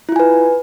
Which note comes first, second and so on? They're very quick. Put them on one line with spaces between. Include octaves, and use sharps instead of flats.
E4 F4 G#5 B4